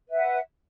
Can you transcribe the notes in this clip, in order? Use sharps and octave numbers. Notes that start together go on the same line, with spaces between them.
B4 E5 F#5